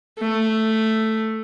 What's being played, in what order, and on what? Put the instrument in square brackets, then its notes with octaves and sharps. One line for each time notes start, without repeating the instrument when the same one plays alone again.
[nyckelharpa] A3